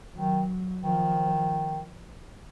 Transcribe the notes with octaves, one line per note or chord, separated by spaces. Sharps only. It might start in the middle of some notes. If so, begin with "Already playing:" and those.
D#3 F#3
D#3 F3